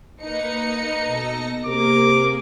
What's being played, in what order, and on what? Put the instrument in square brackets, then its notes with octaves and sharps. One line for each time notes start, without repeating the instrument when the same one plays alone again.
[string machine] A#3 B4 [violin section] D#4 C#7
[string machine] B2 A4 A#6
[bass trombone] C3 [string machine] A#3 G#4 [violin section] A#4 [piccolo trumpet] D6